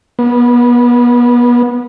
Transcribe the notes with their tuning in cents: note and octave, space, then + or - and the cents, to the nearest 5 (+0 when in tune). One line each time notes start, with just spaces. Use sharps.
B3 -30